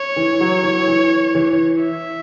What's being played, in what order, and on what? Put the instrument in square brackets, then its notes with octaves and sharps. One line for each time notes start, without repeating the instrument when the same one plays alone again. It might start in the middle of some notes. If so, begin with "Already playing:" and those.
Already playing: [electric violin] C#5
[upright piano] E3
F#3
E3
E3
E3
[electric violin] E5